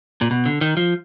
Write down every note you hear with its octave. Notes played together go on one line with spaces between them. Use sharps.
A#2
B2
D3
D#3
F3